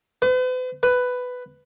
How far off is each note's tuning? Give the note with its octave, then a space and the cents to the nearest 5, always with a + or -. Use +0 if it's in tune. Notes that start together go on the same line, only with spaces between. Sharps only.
B4 +45
B4 +10